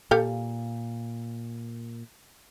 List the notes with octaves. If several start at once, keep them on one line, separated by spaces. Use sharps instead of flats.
A#2 G4 A4 F5